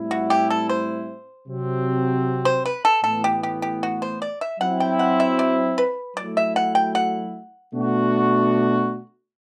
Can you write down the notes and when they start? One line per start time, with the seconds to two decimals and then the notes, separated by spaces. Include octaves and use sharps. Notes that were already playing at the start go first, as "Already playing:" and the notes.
Already playing: A2 G3 C4 E4
0.11 F#4
0.30 G4
0.50 A4
0.69 C5
1.48 C3 F#3 C4
2.45 C5
2.66 B4
2.85 A4
3.04 A2 E3 B3 A4
3.24 G4
3.43 G4
3.62 G4
3.83 F#4
4.02 C5
4.22 D5
4.41 E5
4.60 F#3 C4 E4 F#5
4.80 G5
4.99 F#5
5.20 E5
5.39 D5
5.78 B4
6.17 F#3 A3 E4 D5
6.37 E5
6.56 F#5
6.75 G5
6.95 F#5
7.73 B2 A3 D4 F#4